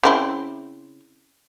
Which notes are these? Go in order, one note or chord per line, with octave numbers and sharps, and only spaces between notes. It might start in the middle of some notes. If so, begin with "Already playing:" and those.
C#3 C4 E4